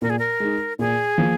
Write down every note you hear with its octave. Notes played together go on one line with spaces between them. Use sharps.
A#2 A#4
G#4
A#4
G#3 D#4
A#2 G#4
F3 A#3